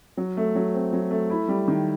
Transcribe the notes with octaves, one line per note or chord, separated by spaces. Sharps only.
F#3
A3
F#3
C4
F#3
A3
E4
G3
D#3